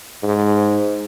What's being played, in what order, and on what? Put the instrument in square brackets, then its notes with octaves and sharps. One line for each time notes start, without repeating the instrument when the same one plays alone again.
[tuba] G#2